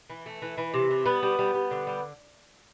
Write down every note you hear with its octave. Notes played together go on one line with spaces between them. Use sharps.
E3
A3
E3
E3
C3
E3
G3 B3
G3
G3
G3
D3
G3